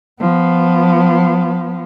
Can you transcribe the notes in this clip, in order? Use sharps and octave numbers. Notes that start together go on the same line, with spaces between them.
F3 B3